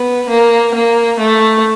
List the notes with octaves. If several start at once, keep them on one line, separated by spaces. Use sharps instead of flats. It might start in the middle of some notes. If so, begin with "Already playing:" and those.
Already playing: B3
A#3
A#3
A3